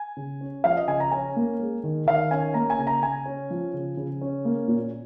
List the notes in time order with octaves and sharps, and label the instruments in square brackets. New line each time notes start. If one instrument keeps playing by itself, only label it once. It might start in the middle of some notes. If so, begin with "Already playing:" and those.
Already playing: [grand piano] G#5
C#3
C#4
F3 F5
D#5
C#3 G#5
A#5
C#4 G#5
A#3
G#3
D#3
D#3 F5
C#4 G#5
A#3 A#5
G#5
C#3
A#5
C#3 G#5
C#4
F3
C#3
C#3
C#4
A#3
A#2